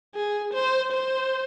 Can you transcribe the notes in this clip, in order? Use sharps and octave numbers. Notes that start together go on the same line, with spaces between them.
G#4
C5
C5